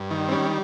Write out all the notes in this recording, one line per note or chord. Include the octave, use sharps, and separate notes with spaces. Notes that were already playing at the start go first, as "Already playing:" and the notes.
Already playing: G2
D#3
C4
G3 C#4